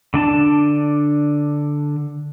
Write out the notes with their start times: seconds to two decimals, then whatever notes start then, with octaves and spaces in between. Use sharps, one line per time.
0.14 D3 D4 A5